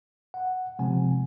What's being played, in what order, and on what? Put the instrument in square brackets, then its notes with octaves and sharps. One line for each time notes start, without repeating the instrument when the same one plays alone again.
[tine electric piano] F#5
C3 F3 G#3 C4 G#5